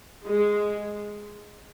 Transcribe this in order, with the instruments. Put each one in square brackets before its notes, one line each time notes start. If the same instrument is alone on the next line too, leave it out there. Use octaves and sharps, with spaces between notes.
[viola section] G#3